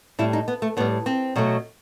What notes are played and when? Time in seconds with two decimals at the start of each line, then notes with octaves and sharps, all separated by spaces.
0.19 A2 G3 E4
0.33 D#4
0.48 B3
0.62 A3
0.77 A2 G3 B3
1.06 C4
1.36 B2 F#3 A3